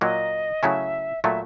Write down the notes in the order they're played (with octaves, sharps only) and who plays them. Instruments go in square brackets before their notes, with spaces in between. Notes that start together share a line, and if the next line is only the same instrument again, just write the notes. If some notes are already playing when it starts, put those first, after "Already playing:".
[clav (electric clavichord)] A#2 F#3 A#3 [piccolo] D#5
[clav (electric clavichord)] C#3 F#3 A3 C#4 E4 [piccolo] E5
[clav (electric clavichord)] A#2 F#3 A3 [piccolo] E5